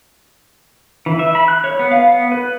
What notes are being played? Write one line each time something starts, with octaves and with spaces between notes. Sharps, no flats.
E3
E5
B5
F#6
C#5
B3
F5
B3
B4